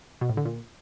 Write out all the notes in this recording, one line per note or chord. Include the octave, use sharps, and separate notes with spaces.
B2
A2
D3
A#2